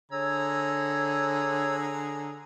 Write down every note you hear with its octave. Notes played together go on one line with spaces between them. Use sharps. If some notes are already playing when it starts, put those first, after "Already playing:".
D3 G#4 C#5 A#5 E6 G#6